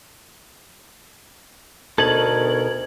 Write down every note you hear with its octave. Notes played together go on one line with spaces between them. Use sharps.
D2 B2 B3 D#4 A4 A#4 G#6 F#7